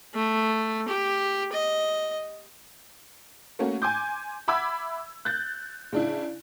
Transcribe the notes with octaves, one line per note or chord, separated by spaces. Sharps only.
A3
G4
D#5
A3 A#3 C#4 F#4
G#5 C6 D6 G6
E5 F#5 B5 D6 E6 G#6
F#6 G6 A6
C#3 D4 E4